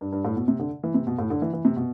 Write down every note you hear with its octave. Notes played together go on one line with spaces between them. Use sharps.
G2
G2
A2
B2
C3
D3
E3
C3
B2
A2
D3
E3
E3
C3
B2